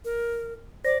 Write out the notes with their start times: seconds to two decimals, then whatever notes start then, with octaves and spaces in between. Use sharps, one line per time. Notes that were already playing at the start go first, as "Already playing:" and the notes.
0.05 A#4
0.84 C5 D5 A#6